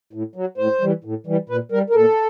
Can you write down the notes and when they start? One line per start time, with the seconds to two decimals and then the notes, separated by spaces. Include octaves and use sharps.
0.13 A2
0.36 F#3
0.58 A2 C5
0.81 E3 G3
1.04 A2
1.27 E3 G3
1.49 A#2 B4
1.72 G3 A#4
1.90 A#4
1.95 A#2 A4